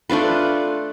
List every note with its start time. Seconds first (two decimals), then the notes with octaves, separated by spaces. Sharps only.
0.09 A3 D4 F4 B4